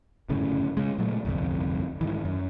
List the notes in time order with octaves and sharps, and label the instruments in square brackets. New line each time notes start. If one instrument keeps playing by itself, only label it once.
[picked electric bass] G1 F#2 A2 C#3
C#3 G#3
A#2 F#3 A3
G1 C2 F2
G#2 D#3 E3
F#2